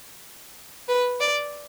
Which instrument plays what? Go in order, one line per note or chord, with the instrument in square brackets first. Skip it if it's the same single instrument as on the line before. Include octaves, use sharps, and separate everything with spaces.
[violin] B4
D5